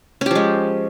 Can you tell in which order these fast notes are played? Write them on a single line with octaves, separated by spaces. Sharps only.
C#4 G4 F3 G#3